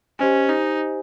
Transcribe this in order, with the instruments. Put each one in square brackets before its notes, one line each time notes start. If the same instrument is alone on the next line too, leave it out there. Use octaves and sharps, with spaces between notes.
[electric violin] C#4 [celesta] G4 C5 D#5 G#5
[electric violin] D#4